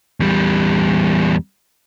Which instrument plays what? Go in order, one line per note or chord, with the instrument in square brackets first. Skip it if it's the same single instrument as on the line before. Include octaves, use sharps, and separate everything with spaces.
[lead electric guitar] E2 G3